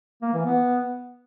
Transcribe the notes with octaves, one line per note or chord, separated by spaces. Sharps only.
A#3
E3
B3